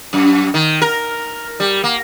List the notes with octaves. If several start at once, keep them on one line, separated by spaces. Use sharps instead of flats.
F#2
D#3
A#4
G3
A#3